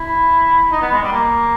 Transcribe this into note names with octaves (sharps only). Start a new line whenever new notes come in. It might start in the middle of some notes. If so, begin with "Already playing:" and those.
Already playing: E4
D#4
B3
G#3
G3
A#3